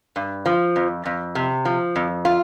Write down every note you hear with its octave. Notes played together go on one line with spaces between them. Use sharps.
G2
F3
F2
F2
C3
F3
F2
F4